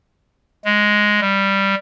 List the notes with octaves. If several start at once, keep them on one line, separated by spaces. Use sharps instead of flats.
G#3
G3